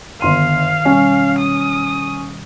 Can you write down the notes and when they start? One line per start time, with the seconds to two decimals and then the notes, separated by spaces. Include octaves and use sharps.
0.21 G1 D#3 F5 C6 D#7
0.85 B2 G3 C#4
1.38 D#6